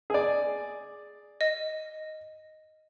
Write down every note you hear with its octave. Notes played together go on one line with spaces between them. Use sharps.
G#4 D5
D#5